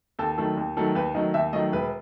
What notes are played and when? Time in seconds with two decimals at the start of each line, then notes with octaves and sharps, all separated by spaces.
0.19 D#2 A4
0.38 D#3 F#3 A3 A4
0.57 D#2
0.77 D#3 F#3 A3 A4
0.95 D#2 B4
1.15 D#3 F#3 A3 D#5
1.34 D#2 E5
1.53 D#3 F#3 A3 D#5
1.72 E1 B4